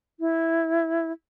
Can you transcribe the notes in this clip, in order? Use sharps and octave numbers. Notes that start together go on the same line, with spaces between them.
E4